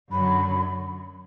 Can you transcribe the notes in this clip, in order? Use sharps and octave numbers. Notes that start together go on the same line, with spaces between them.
F#2 D3 F#3 B5